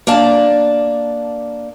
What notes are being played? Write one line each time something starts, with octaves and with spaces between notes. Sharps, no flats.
A#3 D4 D5 A5